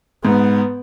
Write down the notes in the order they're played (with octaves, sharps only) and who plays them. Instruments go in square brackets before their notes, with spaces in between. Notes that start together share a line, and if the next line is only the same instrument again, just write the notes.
[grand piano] G#2 [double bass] B3